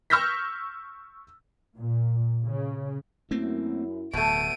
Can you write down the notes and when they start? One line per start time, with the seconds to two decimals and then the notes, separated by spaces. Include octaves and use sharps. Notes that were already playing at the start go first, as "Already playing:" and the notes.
0.10 C#6 E6 F6 G6 A#6 B6
1.78 A#2
2.45 C#3
3.31 F#2 A3 A#3 C4 E4
4.13 D1 B2 A3 D7 D#7